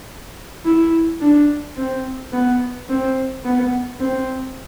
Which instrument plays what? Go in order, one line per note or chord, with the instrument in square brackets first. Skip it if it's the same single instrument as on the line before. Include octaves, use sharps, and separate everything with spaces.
[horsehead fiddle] E4
D4
C4
B3
C4
B3
C4